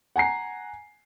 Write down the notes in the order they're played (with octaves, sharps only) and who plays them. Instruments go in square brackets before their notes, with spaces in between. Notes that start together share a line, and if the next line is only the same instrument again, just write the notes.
[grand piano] F#5 G#5 A#5 C7